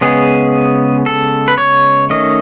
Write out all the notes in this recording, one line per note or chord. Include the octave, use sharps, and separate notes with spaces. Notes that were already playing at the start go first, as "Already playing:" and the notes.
C#3 G#3 B3 G#4
A4
B4
C#5
D#3 A3 C#4 D#5